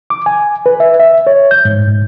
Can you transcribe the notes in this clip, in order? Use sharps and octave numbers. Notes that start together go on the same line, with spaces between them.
D6
G#5
B4
E5
E5
C#5
G6
G#2
G#2